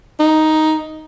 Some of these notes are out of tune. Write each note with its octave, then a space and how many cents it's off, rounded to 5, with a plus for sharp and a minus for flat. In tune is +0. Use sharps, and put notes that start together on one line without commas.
D#4 +5